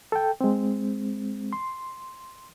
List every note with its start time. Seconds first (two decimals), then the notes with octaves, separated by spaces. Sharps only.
0.12 A4 G5
0.41 G#3 C4
1.53 C6